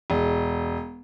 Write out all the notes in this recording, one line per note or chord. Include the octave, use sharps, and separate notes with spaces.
E1